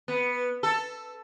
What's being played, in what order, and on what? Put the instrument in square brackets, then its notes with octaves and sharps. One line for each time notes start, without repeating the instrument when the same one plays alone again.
[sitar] B3
A4